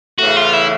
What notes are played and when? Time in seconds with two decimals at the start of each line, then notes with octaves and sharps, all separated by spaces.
0.19 E2 C#3 E3 A3 F#4
0.37 F4
0.53 E4